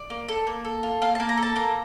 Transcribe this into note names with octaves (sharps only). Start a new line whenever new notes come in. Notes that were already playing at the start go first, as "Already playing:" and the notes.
Already playing: D5
A#3
A4
A#3
A4
F4
A#3 F5
A#3 A5
A#5
A4
A5
A#3 A#5